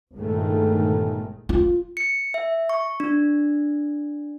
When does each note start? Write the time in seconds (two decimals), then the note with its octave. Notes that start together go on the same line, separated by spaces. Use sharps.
0.16 G1 A#2 D#3 G#3 A3
1.49 F4
1.97 C#7
2.34 E5
2.69 C#6
3.00 D4